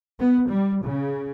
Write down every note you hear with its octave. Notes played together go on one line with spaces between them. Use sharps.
B3
G3
C#3